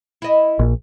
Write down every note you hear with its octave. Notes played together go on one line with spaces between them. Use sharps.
E4 D#5
A#1